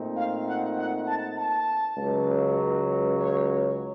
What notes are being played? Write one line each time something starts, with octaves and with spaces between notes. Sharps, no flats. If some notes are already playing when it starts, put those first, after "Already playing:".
Already playing: A#2 A3 C4 D#4
F5
F#5
F#5
A5
A5
C#2 C#3 F#3
C#5